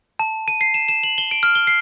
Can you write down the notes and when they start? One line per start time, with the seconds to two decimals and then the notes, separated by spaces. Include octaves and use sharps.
0.19 A5
0.48 D#7
0.61 C7
0.74 E7
0.89 E7
1.04 F#7
1.18 G7
1.31 D7
1.43 F6
1.55 G7
1.67 C7